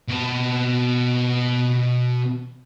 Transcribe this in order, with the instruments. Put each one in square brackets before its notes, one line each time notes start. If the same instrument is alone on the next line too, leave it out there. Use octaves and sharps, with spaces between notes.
[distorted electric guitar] B2 A5